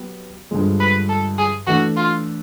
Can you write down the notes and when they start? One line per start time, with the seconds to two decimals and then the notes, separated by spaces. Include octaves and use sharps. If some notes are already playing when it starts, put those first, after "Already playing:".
Already playing: F#3 B3 G4
0.51 G2 D3 F3 G#3
0.80 B4
1.09 A4
1.38 G#4
1.67 E3 A3 D4 F#4
1.97 F4